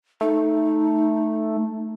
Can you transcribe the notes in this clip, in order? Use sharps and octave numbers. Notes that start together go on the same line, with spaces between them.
A3 D#4